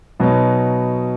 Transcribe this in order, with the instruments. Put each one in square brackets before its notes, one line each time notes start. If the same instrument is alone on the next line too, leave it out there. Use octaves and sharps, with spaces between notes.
[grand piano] B2 F#3 B3 D#4